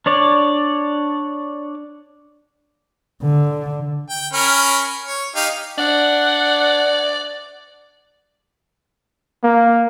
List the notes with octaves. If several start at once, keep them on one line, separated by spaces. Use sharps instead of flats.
D4 C#5 D5
D3
G5
C#4 A#4 B5
C#5
D#4 G4 F5
D4 D5 F#5
A#3